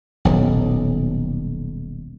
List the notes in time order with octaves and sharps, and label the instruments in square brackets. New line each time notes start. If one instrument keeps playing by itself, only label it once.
[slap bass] D#1 B1